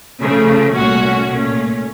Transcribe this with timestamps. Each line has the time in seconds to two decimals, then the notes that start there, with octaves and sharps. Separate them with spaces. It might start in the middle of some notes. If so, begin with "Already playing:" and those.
0.22 C#3 F3 A3
0.75 C2 A#2 A3 C#4 F#4
1.28 A#2 A3 C#4